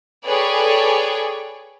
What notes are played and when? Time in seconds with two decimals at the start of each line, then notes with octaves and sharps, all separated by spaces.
0.25 G#4 A4 B4 C#5 D5 G5